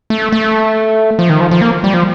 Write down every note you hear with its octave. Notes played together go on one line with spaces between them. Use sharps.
A3
A3
F3
D#3
F3
F3
A#3
G3
F3